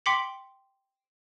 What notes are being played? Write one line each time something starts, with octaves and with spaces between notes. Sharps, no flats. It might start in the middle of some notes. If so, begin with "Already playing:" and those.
G5 C6 D6 B6 C#7 F#7